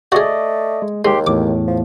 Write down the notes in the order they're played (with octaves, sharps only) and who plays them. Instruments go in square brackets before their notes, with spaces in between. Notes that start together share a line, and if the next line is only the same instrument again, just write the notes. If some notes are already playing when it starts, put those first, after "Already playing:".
[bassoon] A3 [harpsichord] F#4 G#4 [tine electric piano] D5 D#5
[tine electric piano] G#3
[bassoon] D#2 [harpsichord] G#3 [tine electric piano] G4 C6
[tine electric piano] E2 A2 [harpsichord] D6
[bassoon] F3